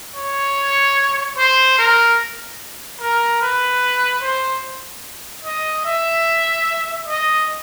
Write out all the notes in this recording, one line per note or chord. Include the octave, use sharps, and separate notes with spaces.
C#5
C5
A#4
A#4
B4
C5
D#5
E5
D#5